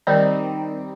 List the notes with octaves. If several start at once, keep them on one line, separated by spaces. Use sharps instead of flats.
D#3 G3 C4 D#4